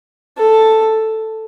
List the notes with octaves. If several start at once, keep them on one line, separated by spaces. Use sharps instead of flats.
A4